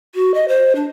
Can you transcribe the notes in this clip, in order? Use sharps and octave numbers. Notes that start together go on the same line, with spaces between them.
F#4
D#5
C5
D4